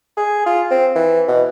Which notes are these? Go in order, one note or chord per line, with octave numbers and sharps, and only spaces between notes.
G#4
F4
C4
E3
B2